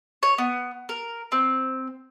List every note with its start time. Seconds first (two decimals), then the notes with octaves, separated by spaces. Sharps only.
0.23 C#5
0.38 B3
0.89 A#4
1.32 C4